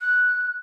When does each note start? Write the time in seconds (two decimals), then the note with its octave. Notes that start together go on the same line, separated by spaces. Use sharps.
0.01 F#6